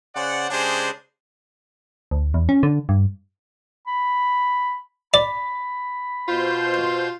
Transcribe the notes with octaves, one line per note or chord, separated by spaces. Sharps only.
C#3 C5 D5 F#5
C#3 G#3 D4 G4 G#4 C5
D2
E2
C#4
D3
G2
B5
D5 B5
B2 F4 C5 G6